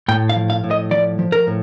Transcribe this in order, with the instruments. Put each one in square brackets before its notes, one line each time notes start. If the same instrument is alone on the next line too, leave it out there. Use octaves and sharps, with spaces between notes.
[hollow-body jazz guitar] A2 G5
F5
F3
F5
A2
D#5
F3 D5
F3
A#4
A2